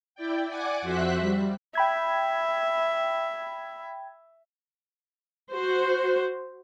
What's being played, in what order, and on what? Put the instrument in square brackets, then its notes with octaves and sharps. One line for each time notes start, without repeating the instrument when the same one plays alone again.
[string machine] E4 D5 G5
D5 F#5 G#5 D6
F2 F#4 C5 E5 F#6 B6
G3
[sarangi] E5 [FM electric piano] G5 B5 G#6
[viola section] F#4 C5